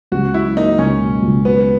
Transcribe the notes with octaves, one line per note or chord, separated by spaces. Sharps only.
C#2 F#4
F#3 E4
A#3 D#4
C#2 C#4
B2
C#2
F#3 B3